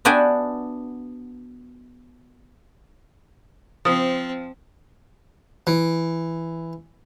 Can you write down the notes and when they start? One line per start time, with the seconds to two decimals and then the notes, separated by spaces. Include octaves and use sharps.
0.05 B3 D4 F#4 E5 G5 G#5
3.85 F3 C4 D#6
5.67 E3